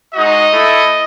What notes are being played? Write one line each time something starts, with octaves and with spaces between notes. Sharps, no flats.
G#3 D#4 F#4 D#5
A3 E4